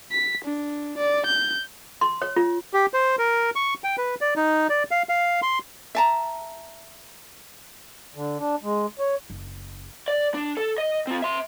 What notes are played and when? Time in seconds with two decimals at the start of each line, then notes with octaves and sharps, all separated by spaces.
0.11 B6
0.44 D4
0.98 D5
1.26 G6
2.01 C6
2.22 C#5
2.36 F4
2.74 G4
2.93 C5
3.19 A#4
3.56 C#6
3.84 G5
3.98 B4
4.21 D5
4.36 D#4
4.69 D5
4.91 F5
5.09 F5
5.42 C6
5.95 E5 A5 A#5
8.15 D3
8.39 D4
8.63 G#3
8.99 C#5
9.30 F#1
10.08 D5
10.34 D4
10.57 A4
10.78 D#5
11.07 C4 F4
11.22 E5 C6